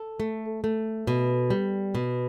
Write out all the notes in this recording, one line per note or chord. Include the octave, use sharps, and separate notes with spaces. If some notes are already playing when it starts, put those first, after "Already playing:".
Already playing: A4
A3
A3
B2
G3
B2